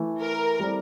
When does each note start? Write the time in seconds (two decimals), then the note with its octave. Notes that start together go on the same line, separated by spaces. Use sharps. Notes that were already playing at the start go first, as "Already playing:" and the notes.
Already playing: E3 A3 E4
0.21 A#4
0.60 G3 C4 E4 A4 D5